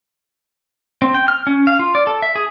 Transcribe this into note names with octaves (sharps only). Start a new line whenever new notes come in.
C4
G5
F6
C#4
F5
F4
D5
A4
E5
G#4